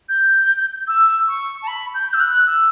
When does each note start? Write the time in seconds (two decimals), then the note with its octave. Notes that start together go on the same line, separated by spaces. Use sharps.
0.09 G6
0.88 E6
1.28 C#6
1.63 A5
1.67 B5
1.95 G6
2.14 E6
2.20 F#6
2.47 E6